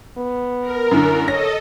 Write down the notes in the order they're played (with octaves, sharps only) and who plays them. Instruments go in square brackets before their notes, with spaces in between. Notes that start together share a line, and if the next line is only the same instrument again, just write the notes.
[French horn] B3
[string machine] A#4
[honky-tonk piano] F#2 A2 D3
[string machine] A4 D#5 [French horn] C#5 [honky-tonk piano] A#6